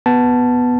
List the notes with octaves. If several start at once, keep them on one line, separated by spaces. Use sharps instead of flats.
B3 A5